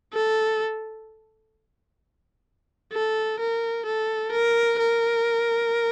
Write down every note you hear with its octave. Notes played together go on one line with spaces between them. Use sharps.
A4
A4
A#4
A4
A#4
A#4